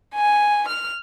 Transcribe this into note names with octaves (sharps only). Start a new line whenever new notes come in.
G#5
F6